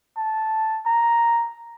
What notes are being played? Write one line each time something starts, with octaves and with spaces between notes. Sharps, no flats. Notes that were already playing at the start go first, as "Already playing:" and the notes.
A5
A#5